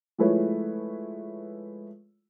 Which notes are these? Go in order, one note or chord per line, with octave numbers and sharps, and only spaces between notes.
F3 G#3 A3 E4 B4 C#5